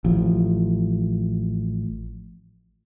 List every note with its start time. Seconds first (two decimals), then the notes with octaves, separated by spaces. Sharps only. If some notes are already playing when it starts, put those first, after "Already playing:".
0.05 A1 F3